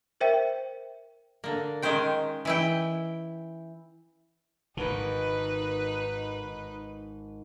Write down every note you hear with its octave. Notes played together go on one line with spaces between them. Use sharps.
A#4 C5 E5 G5
D3 A#3
D#3 G#3 C#4 C5 G5
E3 E4 G5
G#1 G#2 D#3 D#4 B4